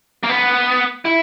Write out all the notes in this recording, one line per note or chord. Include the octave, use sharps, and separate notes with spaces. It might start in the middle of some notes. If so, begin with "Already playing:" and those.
A#3
B3
E4